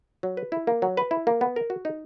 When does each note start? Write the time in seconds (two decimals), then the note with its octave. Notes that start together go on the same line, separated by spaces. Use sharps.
0.23 F#3
0.37 B4
0.52 E4
0.67 A#3
0.82 F#3
0.97 B4
1.11 E4
1.27 A#3
1.41 B3
1.56 A#4
1.70 F#4
1.85 D#4